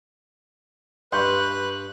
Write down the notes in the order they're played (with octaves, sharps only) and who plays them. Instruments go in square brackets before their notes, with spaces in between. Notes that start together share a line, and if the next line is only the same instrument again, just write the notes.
[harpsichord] G2 [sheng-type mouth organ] B4 F#6 [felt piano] C6 C#6 G6